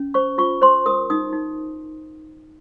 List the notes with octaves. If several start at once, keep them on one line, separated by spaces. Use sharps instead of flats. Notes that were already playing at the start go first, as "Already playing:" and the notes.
Already playing: C#4
C5 C#6
F4 C#6
C5 C6
A#4 D#6
D#4 D#6
D#4